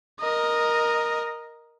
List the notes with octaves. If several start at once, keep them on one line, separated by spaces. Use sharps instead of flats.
A#4 D#5